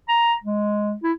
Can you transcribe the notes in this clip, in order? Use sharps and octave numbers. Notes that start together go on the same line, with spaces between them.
A#5
G#3
E4